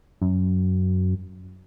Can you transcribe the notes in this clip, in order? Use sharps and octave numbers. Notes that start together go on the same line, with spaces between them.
F#2